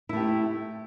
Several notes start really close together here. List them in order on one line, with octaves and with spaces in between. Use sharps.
E4 A3 G4 C4